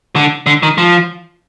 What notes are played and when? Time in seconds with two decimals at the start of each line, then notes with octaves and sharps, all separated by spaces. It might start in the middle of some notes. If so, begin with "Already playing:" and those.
0.16 D3
0.46 D3
0.63 D#3
0.78 F3